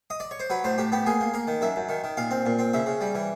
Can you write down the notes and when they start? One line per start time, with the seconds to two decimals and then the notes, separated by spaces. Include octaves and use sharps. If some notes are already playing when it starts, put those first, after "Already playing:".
0.10 D#5
0.20 D5
0.31 C#5
0.40 C5
0.50 F#3 B4
0.64 A2 C5
0.78 A2 G4
0.92 B3 G4
1.06 A#3 G#4
1.20 A#3
1.34 A#3 A#4
1.47 D#3
1.61 F#2 E5
1.76 F#2
1.89 D#3
2.04 D#3
2.17 A#2 F5
2.31 C4
2.46 A#2
2.59 C4
2.74 C#3 E5
2.86 C#3
3.01 G3
3.15 E3